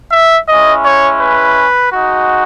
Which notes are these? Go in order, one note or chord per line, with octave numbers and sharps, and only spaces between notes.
E5
G#3 C#4 E4 D#5
C#5
B4
G#3 D#4 F#4